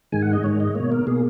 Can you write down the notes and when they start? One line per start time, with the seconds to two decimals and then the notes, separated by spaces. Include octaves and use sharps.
0.12 G#2 D#3 G#3 G#5
0.22 F#5
0.33 D#5
0.43 G#2 D#3 G#3 C#5
0.60 D#5
0.75 B2 A#3 C#5
0.92 A#4
1.07 B2 A#3 G#4